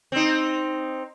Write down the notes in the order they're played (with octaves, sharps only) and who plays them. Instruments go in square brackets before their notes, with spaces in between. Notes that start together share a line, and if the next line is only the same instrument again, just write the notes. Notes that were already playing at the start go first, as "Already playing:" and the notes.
[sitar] C4 D#4